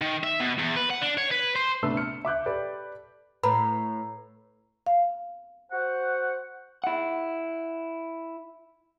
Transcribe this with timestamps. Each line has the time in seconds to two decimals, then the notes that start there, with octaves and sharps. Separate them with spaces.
0.02 D#3
0.23 E5
0.40 B2
0.58 E2
0.76 B4
0.90 F#5
1.02 D4
1.18 C#5
1.31 B4
1.56 C5
1.83 C3 A3 B3 D4 E6
1.97 F6 C#7
2.25 E5 D6 F#6 G6
2.46 G4 A4 B4 D5
3.43 A2 B4 A#5 B5
4.87 F5
5.71 F#4 C5 F#5
6.84 E4 F#5